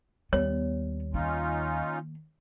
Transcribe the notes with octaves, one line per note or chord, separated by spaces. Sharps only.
D#2 G3 B3 C#5
D#3 A#3 C#4 D#4 F4